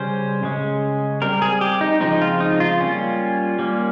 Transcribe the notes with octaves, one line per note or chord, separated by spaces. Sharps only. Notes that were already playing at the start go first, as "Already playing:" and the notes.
Already playing: C#3 G3 C#4 C5
C#3 G#3 C#4
G3 C4 A#4
G#4
G4
D#4
C#3 F3 G#3 C4 D#4
F4
D#4
F4
G3 A#3 C#4
G3 A#3 C#4